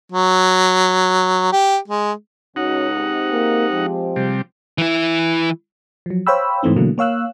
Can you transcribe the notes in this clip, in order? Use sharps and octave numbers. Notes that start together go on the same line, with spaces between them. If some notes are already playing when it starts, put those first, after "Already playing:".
F#3
G4
G#3
C#2 C#4 D#4 F#4 F#5
G#3 C4 G4
A#3
F3
C3 G3
E3 E4
F3 F#3
C5 C#5 F5 G5 B5 E6
G#2 E3 A3 C4 D#4
B2 D3 E3 F#3 A3 A#3
A#3 C#5 F5 E6 F#6